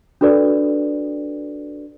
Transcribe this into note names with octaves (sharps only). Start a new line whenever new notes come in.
D4 F#4 A4 B4 D5